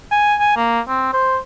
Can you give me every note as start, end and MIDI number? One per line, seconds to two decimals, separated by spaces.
0.12 0.35 80
0.40 0.56 80
0.56 0.80 58
0.89 1.12 60
1.13 1.38 72